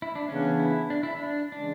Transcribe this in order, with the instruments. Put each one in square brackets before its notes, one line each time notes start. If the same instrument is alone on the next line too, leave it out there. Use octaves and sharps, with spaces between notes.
[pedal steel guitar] E4
D4
[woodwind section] C#3 E3 B3 D4 [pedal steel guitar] C#4
[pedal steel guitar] E4
D4
E4
D4
[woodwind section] C#3 E3 G#3 C#4 [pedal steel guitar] D4